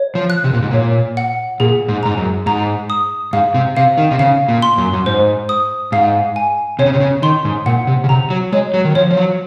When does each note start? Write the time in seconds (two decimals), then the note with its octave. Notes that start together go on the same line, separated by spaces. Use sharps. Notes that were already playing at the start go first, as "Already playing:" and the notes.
Already playing: C#5
0.15 F3
0.30 F#6
0.44 C3
0.53 A#2
0.62 G#2
0.71 A#2 C#5
1.17 F#5
1.60 A#2 G#4
1.88 G#2
2.03 G#2 A#5
2.17 F#2
2.46 G#2 A#5
2.90 D#6
3.33 G#2 F5
3.54 C3
3.77 C3 F5
3.98 D#3
4.11 C3
4.19 C#3 F5
4.48 A#2
4.62 C6
4.78 F#2
4.93 F#2
5.06 G#2 C5
5.49 D#6
5.92 G#2 F5
6.36 G#5
6.79 C3 C#5
6.86 C#3
6.94 C3
7.00 C#3
7.22 D#3 C6
7.45 G#2
7.66 A#2 F#5
7.87 C3
8.04 C#3
8.09 C3 A#5
8.30 F#3
8.52 G#3 C#5
8.74 F#3
8.85 D#3
8.95 F3 C#5
9.11 F3
9.17 F#3